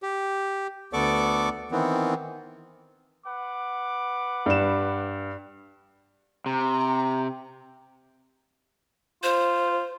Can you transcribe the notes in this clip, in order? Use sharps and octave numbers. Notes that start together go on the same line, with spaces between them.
G4
D2 B3 A4 D5 C#6 D6
D#3 E3 B3 C4
B4 F#5 D6
G2 E7
C3 A#5
F4 C5